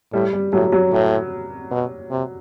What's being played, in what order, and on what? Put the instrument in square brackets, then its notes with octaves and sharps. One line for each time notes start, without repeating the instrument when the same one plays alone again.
[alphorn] A2 [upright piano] G3
[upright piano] G3
[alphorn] A2 [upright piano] F#3
[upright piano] F#3
[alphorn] A2
B2
C3